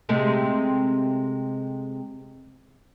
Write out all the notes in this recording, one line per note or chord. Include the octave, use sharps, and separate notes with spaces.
C3 G#3 A3